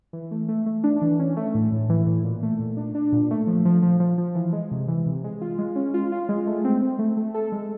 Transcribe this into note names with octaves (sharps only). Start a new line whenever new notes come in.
E3
A3
A3
A3
D4
E3
C#4
A3
A2
A2
E3
A2
A#2
A3
A#2
D4
D4
A#2
A3
F3
F3
F3
F3
F3
E3
G#3
C3
E3
C3
G#3
F4
G#3
C#4
F4
F4
G#3
A3
C4
C4
A3
A3
A4
G#3